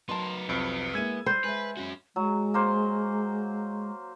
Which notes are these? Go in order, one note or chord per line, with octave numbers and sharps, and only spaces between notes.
F#3 B3 D#4 A#4 A5 C6
C2 F2 B3
G#3 A#3 E4 E6 G#6 D#7
G3 C5 B5
G#3 B4 E5
C#4 F#4
F#3 G#3
A#3 C5